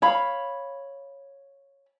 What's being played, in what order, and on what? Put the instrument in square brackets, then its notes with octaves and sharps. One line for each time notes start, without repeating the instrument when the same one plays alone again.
[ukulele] C#5 F5 B5